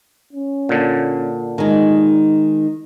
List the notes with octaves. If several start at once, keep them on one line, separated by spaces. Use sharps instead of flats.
C#4
A#2 D3
D#3 G#3 D#4